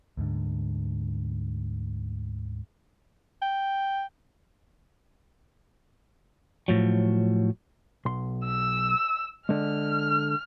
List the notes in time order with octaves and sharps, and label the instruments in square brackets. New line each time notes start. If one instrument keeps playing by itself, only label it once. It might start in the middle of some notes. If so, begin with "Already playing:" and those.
[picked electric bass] D2 G#2 D3
[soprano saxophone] G5
[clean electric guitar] A2 F3 F#3
[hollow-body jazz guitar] B1 C6
[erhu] E6
[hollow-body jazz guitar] D3 G#3 [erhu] F6